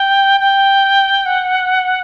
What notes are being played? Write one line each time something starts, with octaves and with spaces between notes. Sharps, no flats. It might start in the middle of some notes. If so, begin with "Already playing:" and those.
Already playing: G5
G5
F#5